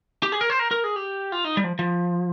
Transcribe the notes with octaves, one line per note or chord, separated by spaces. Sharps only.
G4
G#4
A#4
C5
A#4
A#4
G#4
G4
F4
D#4
G3
F3
F3